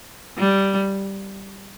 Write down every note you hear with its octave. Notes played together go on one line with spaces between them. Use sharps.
G3